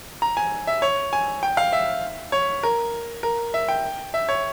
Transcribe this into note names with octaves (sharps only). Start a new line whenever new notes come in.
A#5
G#5
E5
C#5
G#5
G5
F5
E5
C#5
A#4
A#4
E5
G5
E5
C#5